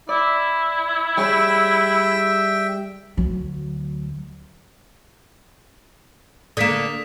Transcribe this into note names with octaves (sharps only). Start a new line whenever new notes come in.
E4 D5
G3 G#4 C#5 E5 G5
D2 F#3
D3 A#3 D#6 B6 E7